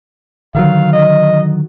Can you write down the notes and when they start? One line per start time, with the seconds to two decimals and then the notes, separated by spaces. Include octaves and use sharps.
0.55 D3 D#3 F#3 F5
0.93 D#5